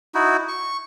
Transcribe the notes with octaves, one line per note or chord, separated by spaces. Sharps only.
D#4 E4 F#4
C#6